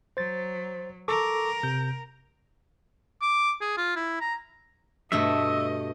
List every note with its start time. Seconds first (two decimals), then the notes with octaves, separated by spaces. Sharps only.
0.17 F#3 C5 A6
1.08 A4 A#4 C#6 D6
1.63 C3 G6
3.22 D6
3.61 G#4
3.77 F4
3.96 E4
4.20 A#5
5.12 G2 B2 A3 D#5 E5